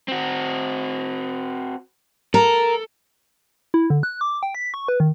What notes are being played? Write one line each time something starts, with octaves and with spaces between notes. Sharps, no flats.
C4 F#4
A4 A#4
E4
D3
F#6
D6
G5
B6
C#6
B4
D#3